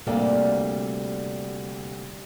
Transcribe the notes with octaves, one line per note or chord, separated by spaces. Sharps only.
D2 C3 G3 A#3 A4 F5